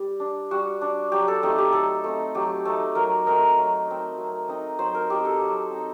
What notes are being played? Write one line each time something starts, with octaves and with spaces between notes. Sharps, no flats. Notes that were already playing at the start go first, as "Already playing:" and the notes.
Already playing: G3 G4
D4
G3 F#4
D4
F#3 G4
A4
A3 C4 D#4 G4
G4
F#3 A4
A3 C4 D#4
F#3 G4
A3 C4 D#4
F#3 A#4
A3 C4 D#4 A#4
F#3
C4 D#4
F#3
C4 D#4
F#3 C5
A#4
C4 D#4 G4
A4
F#3
C4 D#4